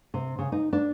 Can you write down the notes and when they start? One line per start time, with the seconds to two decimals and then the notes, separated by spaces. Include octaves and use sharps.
0.14 C3
0.39 C#3
0.52 D#4
0.73 D4